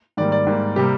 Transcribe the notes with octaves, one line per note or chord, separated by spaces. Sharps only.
G#2 D#3 G3 A#3 D5
D5
G#2 G3 A#3
C3 G3 A#3 G4